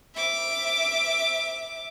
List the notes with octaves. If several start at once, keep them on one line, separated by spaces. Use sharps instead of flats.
E5 D6